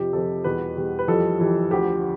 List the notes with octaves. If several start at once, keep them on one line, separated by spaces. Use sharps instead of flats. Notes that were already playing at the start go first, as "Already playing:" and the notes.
Already playing: F2 C3 F3 G4
F2 C3 F3 A4
E2 B2 G3 B4
E2 B2 G3
B4
F2 E3 G3 A4
F2 E3 G3
D2 D3 F3 G4